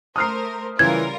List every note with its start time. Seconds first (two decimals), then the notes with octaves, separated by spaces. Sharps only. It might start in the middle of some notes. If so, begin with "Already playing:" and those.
0.16 A3 A#4 C5 D#6 F6 C7
0.79 C#3 E3 G3 F4 A#4 G#6